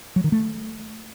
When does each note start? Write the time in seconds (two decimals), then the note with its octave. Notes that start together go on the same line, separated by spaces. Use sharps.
0.16 F#3
0.24 D#3
0.32 A3